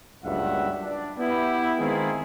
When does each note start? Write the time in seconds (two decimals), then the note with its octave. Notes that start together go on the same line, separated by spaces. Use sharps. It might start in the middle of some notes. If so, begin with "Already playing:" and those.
0.24 F#1 C#2 G2 E5 F#5
0.82 D4
1.18 B3 E4 G4
1.80 D#3 G#3 C4 E4 F4 G#4